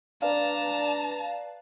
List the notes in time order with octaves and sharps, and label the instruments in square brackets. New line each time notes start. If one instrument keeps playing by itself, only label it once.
[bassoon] D4 [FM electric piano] B4 D5 F5 [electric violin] A5 A#5